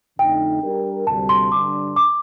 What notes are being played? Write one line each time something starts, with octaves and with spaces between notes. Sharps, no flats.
F2 D3 A3 D#4 G5
G3 D4 G4 A#4
D2 C3 G3 A5
C6
G2 D3 G3 D4 D6
D6